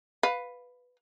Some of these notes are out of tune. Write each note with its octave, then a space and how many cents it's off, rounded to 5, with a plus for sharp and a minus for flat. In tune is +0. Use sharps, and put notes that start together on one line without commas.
B4 +5 F5 +15